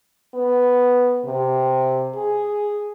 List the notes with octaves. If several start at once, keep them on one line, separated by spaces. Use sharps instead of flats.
B3
C3
G#4